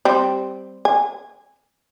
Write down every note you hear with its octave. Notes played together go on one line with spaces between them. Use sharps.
G3 C4
G#5